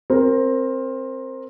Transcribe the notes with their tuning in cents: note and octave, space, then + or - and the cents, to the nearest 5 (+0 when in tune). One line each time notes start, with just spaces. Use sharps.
C4 +15 A#4 +0